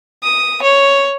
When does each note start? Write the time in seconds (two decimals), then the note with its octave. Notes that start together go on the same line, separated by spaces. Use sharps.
0.23 D#6
0.62 C#5